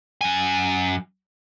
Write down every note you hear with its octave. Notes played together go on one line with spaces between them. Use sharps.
F#2 G#5